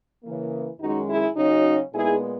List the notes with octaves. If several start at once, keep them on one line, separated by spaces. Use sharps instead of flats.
C#3 E3 A#3
F#2 D#3 G#3 C#4 D#4 F#4
E4 G#4
C#3 F#3 C#4 D#4 F#4
A#2 G#3 B3 D#4 E4 G#4